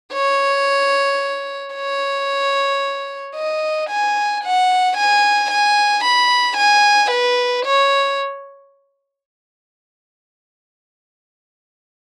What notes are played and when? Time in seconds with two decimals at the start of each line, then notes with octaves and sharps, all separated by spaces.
0.14 C#5
1.74 C#5
3.35 D#5
3.89 G#5
4.43 F#5
4.97 G#5
5.51 G#5
6.04 B5
6.57 G#5
7.11 B4
7.65 C#5